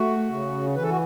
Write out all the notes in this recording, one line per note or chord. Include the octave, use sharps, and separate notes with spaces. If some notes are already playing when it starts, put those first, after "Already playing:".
Already playing: A3 F#4
C#3
E3 B4
A4
F#4